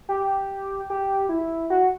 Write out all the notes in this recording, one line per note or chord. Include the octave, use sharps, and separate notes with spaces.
G4
G4
E4
F#4